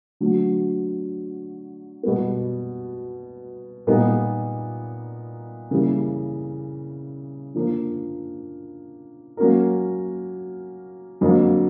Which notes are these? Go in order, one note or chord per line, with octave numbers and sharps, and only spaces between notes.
D3 F#3 A3
B2 G3 B3
A#2 G3 B3 D#4
C#3 E3 G3 A#3
D3 F3 A#3
F#3 A#3 C#4 F#4 A#4
F2 D3 F#3 A#3